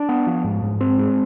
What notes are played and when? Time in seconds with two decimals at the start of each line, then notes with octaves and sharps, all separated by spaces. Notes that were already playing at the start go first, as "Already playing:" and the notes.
Already playing: D4
0.09 B3
0.27 F3
0.44 G#2
0.62 G#2
0.81 C4
0.99 G#3